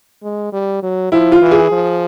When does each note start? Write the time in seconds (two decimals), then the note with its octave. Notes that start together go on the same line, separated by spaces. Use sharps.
0.23 G#3
0.53 G3
0.83 F#3
1.12 F3 E4
1.32 F4
1.42 E3
1.51 G#4
1.71 F3